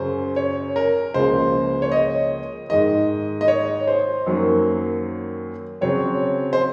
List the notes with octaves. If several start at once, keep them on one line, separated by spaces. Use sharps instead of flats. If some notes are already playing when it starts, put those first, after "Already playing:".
Already playing: F#2 C#3 F#3 C#4 C5
C#5
A#4
C#2 C#3 F3 A#3 F4 C5
C#5
D#5
G#2 D#3 G#3 D#5
D#5
C#5
C5
F#2 D#3 F#3 A#3
C#3 F#3 C4 C#5
C5